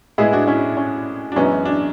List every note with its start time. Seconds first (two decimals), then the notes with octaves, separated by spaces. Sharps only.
0.18 A2 G#3 B3 E4 G#4
0.33 D4 F#4
0.47 C#4 E4
0.77 C#4
1.32 D4
1.36 F#2 E3 G#3 B3 C#4
1.66 D4